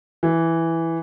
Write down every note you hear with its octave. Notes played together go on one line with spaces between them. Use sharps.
E3